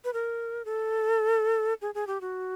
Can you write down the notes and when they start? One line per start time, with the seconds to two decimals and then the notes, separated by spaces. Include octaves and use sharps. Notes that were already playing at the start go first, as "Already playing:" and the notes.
0.05 B4
0.13 A#4
0.65 A4
1.82 G#4
1.95 G#4
2.07 G4
2.21 F#4